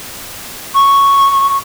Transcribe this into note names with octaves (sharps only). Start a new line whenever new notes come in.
C#6